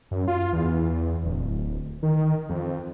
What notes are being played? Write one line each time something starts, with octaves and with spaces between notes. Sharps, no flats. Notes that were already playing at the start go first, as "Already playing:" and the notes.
F#2
F4
E2
D1
D#3
F2